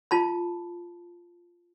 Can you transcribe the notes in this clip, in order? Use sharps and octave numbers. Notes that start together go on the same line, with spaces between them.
F4 A5 B5